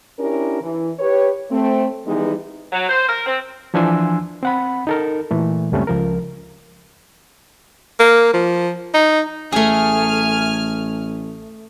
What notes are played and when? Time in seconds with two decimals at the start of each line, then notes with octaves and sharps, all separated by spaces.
0.19 C#4 D4 E4 G4 A#4
0.60 E3
0.99 G4 B4 C#5
1.50 A3 C4
2.06 D#3 E3 G3 G#3 B3 D#4
2.73 F#3
2.89 C5
3.08 A#4
3.26 C4
3.74 E3 F3 D4 G#5 C6 E6
4.43 C4 F#5 B5
4.87 D#4 A4 A#4
5.31 A#2 E3 A3
5.72 C#2 F#2 G3 A3 C4 C#4
5.87 C#2 F3 A#4
8.00 A#3
8.33 F3
8.94 D#4
9.52 A1 A3 G#4 G#5 F6